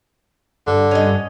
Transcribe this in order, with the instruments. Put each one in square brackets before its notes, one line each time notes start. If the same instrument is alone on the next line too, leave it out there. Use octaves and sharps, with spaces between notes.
[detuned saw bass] G2 [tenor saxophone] D3
[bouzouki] C#4 D#5